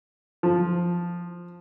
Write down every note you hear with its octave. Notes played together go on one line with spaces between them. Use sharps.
F3